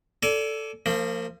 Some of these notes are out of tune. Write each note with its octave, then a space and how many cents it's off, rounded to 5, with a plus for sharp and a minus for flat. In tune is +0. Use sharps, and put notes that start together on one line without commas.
A4 +0 D5 -15 G#5 +30
F3 +0 A#3 -30